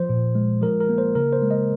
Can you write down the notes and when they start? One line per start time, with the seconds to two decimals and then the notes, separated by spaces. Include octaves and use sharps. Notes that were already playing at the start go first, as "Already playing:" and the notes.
Already playing: F3 C5
0.09 A#2
0.35 G#3
0.62 F3 A#4
0.80 A#4
0.89 A#3
0.98 C5
1.15 C#3 A#4
1.33 C5
1.42 G#3
1.51 D#5